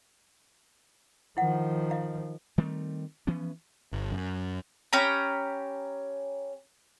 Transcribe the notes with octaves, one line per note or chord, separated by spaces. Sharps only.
D#3 F3 E4 F#5
D#5 F5 A#5
D#3 G3 A3 C4
E3 F3 B3 C#4
G1
F#2
C#4 G4 A#5 B5